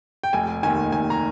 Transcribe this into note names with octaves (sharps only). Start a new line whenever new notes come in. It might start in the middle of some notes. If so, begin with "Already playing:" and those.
G5
F1 G#5
D#2 D#3 G#5
F1 G#5
A#5